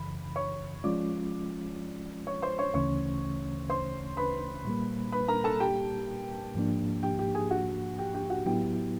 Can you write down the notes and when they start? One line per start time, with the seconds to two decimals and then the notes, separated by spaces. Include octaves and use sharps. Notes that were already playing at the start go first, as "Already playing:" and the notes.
Already playing: F#2 C#3 E3 B5
0.36 C#5 C#6
0.84 F3 G#3 C#4 F4 D5 D6
2.27 C#5 C#6
2.42 C5 C6
2.58 C#5 C#6
2.74 D2 C#3 E3 A3 C#4 C#5 C#6
3.70 C5 C6
4.17 B4 B5
4.65 A#2 G3 A#3
5.12 B4 B5
5.28 A#4 A#5
5.44 A4 A5
5.60 G4 G5
6.55 G#2 F3 A#3 D4
7.03 G4 G5
7.19 G4 G5
7.35 G#4 G#5
7.51 F#4 F#5
7.98 G4 G5
8.14 G4 G5
8.30 F#4 F#5
8.46 A2 F#3 B3 E4 G4 G5